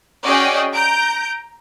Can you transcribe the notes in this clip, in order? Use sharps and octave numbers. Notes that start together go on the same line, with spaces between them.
C#4 F#4 G#4 D5 D#5 G5
A#5 G6 D7